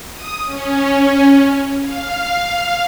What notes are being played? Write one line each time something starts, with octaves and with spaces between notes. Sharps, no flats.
D#6
C#4
F5